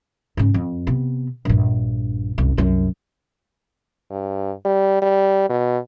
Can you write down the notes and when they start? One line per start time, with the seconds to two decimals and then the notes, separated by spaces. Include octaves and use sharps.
0.37 G#2 C#3
0.54 F2
0.87 C3 B3
1.45 A#1 G2
2.38 F#1 C2
2.57 C2 F#2
4.11 G2
4.65 G3
5.02 G3
5.49 B2